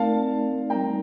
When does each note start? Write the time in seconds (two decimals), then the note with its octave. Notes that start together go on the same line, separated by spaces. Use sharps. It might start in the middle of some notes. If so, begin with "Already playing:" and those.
Already playing: A3 C4 D#4 A#4 D5 F5 A5
0.70 G3 C4 D#4 A#4 G5 A#5